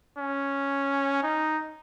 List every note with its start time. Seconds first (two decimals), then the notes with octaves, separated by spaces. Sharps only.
0.18 C#4
1.23 D#4